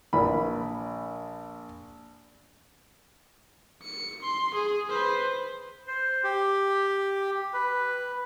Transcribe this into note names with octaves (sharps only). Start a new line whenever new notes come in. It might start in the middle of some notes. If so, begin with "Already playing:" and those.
A#1 B5
C#7
C6
G#4
B4 C5
C5
G4
B4